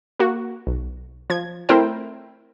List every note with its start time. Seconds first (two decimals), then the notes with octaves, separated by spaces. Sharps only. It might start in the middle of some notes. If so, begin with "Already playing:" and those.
0.19 A#3 F#4
0.67 B1
1.30 F3 G#6
1.69 A3 C4 E4 A#4 C5 G5